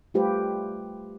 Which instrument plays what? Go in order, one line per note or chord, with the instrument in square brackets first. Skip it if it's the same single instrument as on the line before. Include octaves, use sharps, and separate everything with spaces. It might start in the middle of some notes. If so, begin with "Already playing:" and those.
[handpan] G3 A3 F4 G4 B4 C5